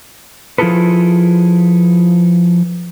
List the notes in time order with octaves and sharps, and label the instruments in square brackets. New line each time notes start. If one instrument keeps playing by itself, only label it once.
[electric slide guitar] F3 E4 F4 G#4 A4 B4